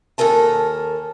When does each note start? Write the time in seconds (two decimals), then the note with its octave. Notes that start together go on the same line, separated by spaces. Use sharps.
0.18 D#2 A4 A#4 G#5 A5